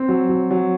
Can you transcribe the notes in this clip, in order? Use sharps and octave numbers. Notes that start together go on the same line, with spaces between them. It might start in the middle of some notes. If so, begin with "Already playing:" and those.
Already playing: C4
F#3
F#3
F#3